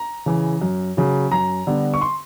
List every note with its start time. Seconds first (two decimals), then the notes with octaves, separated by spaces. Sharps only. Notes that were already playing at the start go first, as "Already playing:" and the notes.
Already playing: A#5
0.26 C#3 E3
0.61 F#2
0.97 C#3 F#3
1.32 F#2 A#5
1.67 D3 G3 B3
1.94 C#6
2.01 C6